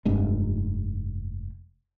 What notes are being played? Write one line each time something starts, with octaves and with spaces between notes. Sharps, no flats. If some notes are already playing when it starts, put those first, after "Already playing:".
F1 G2 G#3